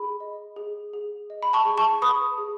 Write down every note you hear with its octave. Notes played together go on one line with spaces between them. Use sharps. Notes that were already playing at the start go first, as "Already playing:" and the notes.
Already playing: G#4 B5
D#5
G#4
G#4
D#5
B5
A5 C#6
G#4
A5 C#6
B4 B5 D#6
G#4